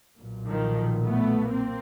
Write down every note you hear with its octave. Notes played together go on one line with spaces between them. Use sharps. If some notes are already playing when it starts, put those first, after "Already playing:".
B1 A#2
D#3 F3
A3 B3
A#3 C4